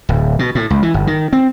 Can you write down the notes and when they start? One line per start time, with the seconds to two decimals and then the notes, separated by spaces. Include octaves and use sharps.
0.09 D1
0.39 B2
0.55 A2
0.70 C#2
0.83 E3
0.94 G1
1.07 D#3
1.33 C4